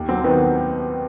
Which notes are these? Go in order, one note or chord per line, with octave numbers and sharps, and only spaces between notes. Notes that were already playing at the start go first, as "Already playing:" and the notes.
Already playing: D#2
F#3 C4
D#3 B3